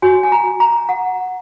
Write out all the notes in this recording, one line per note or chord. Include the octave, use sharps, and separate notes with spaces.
F#4 C#5 G#5
G#5
A#5
A#5
F#5